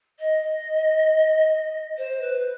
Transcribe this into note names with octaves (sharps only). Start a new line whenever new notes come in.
D#5
C5
B4